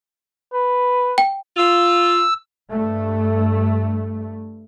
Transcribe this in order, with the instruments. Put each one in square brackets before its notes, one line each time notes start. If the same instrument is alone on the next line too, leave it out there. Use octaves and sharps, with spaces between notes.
[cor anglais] B4
[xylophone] G5
[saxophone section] F4 [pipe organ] E6
[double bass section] G2 A3